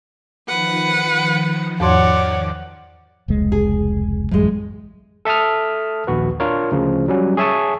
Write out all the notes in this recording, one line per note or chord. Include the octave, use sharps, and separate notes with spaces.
D#3 F3 B4 F#5
E2 G#2 C#5 D5 F#5 C6
F1 C#2 G#3
G#4
A1 F#2 A2 F#3 G#3
A4 E5 A5 D#6 F6
A#1 D#2 F#4 B4
D4 F4 A#4 C#5
D2 C#3 F3
F#3 G3 C#4 F#4
G#4 C#5 E5 G#5 A5 C#6